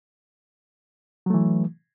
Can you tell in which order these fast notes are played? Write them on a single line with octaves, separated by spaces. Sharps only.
F#3 A3 E3